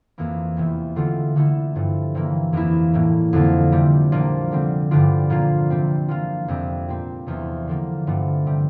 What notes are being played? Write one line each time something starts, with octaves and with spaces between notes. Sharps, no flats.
F2 E3 A#3
E2 C3 E3
D3 A3 C4 F4
D3 A3 E4
G2 F3 A3
C3 E3 A#3
F2 E3 A#3 E4
A2 G3 A#3
F2 D3 F3 A#3 F4
C3 G3 D4
A#2 F3 A#3 D4
D3 G3 C4
G2 D3 G3 D4 F4
A#2 F3 A#3 F4
C3 G3 C4
C3 F3 A#3 F4
F2 C3 G3 C4
A#2 G3 C4
E2 C3 F3 A3
D3 F3 A#3
G2 D3 F3 A3
C3 G3